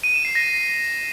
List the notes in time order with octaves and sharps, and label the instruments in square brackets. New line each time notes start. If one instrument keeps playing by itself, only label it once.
[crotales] D#7
E7
C7
A#6